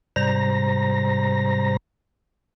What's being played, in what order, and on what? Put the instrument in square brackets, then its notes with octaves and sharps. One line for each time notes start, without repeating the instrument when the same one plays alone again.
[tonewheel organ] G#2 C3 G3 C5 A#5 A#6